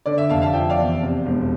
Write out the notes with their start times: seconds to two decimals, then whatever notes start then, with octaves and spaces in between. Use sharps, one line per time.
0.06 D3 D5
0.18 E5
0.29 F1 F5 A5
0.42 F5 A5
0.53 F3 E5 G5
0.70 D5 F5
0.79 E2
1.02 C3
1.26 E1